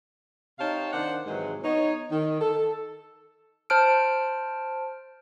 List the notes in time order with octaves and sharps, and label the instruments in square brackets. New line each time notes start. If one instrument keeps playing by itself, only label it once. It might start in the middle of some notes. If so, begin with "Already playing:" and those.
[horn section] C3 D#4 C#5 F5 G5 A5
D#3 D4 C5 D5 F#5
G#2 C3 D#3 E3 F#3 G#3
B3 D#4 C#5
D#3
A4
[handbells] C5 A5 F6 D7